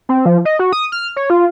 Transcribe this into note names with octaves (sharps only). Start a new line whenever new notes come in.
C4
F3
D#5
F#4
D#6
F6
C#5
F4